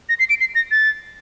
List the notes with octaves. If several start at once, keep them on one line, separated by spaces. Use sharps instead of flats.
A#6
C7
D7
C7
A#6
A6